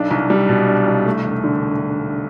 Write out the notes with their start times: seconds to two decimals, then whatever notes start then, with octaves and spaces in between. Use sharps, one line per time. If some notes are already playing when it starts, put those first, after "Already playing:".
Already playing: B1 D4
0.11 C2
0.30 G3
0.49 B2
0.68 D4
0.87 C2
1.06 A3
1.25 E1
1.44 D3